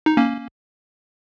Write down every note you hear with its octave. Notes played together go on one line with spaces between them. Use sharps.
D#4
A#3 C#4